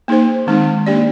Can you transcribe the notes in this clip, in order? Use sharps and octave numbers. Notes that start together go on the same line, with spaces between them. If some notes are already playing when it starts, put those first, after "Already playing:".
A#3 D#4 G#4 C5
D#3 G#3 C4 D#4
A#3 D4 G4 D5